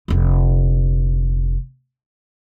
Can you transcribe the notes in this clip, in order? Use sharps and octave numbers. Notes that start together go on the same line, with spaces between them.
F1 D3